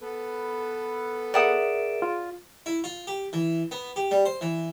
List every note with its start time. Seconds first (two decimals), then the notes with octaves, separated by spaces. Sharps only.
0.02 B3 A4 B4
1.34 G#4 A#4 D5 E5 F#5 D#6 D7 E7
2.02 F4
2.66 E4
2.84 F4
3.07 G4
3.33 E3
3.71 B3
3.96 G4
4.11 G3
4.26 C5
4.41 E3